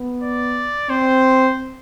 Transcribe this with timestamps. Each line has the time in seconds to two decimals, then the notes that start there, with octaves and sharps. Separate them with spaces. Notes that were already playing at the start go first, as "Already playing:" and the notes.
Already playing: B3
0.23 D5
0.90 C4 C5